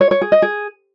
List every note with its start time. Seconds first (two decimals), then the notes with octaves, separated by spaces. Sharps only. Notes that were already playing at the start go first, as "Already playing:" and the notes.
0.01 C#5
0.11 C#5
0.21 G#4
0.32 D#5
0.42 G#4